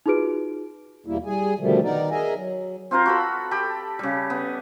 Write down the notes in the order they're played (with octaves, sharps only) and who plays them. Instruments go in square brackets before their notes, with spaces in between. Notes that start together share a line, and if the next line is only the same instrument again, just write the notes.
[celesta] D#4 F4 F#4 G#4 B4 D7
[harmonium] E2 B2 G3 A#3 E4
G3 G#4 G#5
B2 D3 D#3 F3 G3 A3
D#3 B3 D#4 A#4 D5
G#4 A#4 D#5 E5 G#5
F#3
[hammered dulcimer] C4 F4 A#4 C5
F#4 A4 B5
G4 A4 B5
C#3 G3
B3